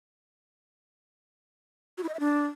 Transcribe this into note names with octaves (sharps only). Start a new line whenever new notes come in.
F#4
E4
D#5
E5
D4